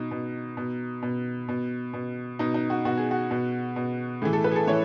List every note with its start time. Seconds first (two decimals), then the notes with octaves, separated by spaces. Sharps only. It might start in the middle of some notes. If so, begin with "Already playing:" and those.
Already playing: B2 D#4
0.11 B2
0.57 B2
1.03 B2
1.48 B2
1.93 B2
2.39 B2 D#4
2.54 D#4
2.70 F#4
2.85 B2 F#4
2.97 G#4
3.11 F#4
3.31 B2
3.76 B2
4.22 A2 E3 G#4
4.33 A4
4.44 B4
4.51 G#4
4.56 A4
4.67 A2 E3 C#5